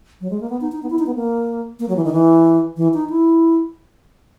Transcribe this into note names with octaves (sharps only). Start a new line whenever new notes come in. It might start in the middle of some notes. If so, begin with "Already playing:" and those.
F#3
G#3
A#3
B3
D#4
D#4
B3
E4
D#4
B3
A#3
A#3
F#3
E3
D#3
E3
E3
D#4
E4